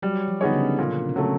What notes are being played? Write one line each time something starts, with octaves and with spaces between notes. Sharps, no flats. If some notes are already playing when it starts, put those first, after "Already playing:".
F#3 G3
F3
D3 B3 D#4 G#4 C#5
C#3
A#2
C3
C#3 F#3 A3